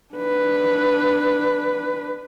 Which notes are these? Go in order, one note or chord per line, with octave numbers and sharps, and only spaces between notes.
D4 B4